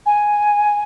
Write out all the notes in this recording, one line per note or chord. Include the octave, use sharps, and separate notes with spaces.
G#5